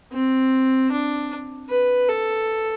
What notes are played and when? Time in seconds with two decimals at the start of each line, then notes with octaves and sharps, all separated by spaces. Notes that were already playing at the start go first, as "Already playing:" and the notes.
0.13 C4
0.92 D4
1.69 B4
2.09 A4